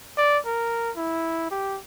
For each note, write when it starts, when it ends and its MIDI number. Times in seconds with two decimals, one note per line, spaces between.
0.17 0.38 74
0.46 0.91 70
0.97 1.49 64
1.51 1.79 67